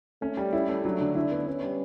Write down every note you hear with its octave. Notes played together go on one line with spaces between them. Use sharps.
A3 C#4
G3
C#4 E4
A3
F#3 D4
D3
D4 E4
B3
B3 C#4
G3